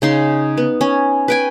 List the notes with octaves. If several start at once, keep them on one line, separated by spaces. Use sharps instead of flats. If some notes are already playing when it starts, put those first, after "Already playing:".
C#3 D#4 C6
B3
C#4
B4 G5 G#5